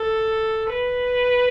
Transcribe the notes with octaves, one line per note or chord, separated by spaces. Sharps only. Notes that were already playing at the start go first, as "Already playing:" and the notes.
Already playing: A4
B4